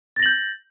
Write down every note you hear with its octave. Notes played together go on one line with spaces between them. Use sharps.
G6 A6 A#6 F#7